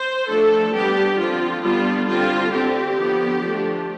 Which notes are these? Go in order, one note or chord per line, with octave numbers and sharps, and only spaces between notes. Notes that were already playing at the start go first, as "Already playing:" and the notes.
Already playing: C5
F3 A3 D4 A4
G3 B3 D4 G4
D3 F3 C4 F4
D3 G3 B3 D4 F4
D3 G3 C4 F4
D3 A3 C4 G4
D3 F3 B3
F3 A3 D4